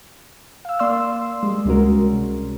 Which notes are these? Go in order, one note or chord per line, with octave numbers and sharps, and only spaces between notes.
F5 E6
A#3 D5 C6 E6
G3 G#3
C#2 C3 G#3 C#4 F#4 A#4
C3